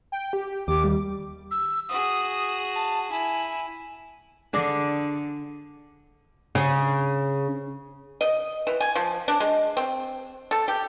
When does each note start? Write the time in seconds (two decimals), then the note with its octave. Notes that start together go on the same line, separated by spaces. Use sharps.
0.12 G5
0.33 G4
0.68 D#2 G4 D6
0.84 G3
1.51 E6
1.89 F#4 G#4 D#6
2.75 A5
3.11 E4 G#5
4.53 D3 D4 G#4 D5
6.55 C#3
8.21 D#5
8.67 E3
8.80 G#5
8.95 F3
9.28 D4
9.40 G#3
9.77 C4
10.51 A4
10.68 G4